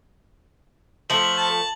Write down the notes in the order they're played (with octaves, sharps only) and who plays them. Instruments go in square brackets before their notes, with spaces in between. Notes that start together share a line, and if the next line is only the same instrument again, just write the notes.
[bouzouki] F3 A3 [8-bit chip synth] A4 C5 [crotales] F#7
[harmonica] A5